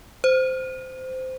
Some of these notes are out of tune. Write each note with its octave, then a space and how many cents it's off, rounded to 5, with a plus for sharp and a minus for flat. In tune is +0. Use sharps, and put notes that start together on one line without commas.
C5 -15